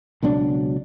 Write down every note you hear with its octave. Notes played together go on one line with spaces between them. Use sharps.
C#2 B2 F#3 D4